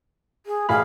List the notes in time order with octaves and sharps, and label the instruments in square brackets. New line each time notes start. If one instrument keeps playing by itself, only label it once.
[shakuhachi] G#4
[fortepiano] A1 F5 B5 [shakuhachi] G#4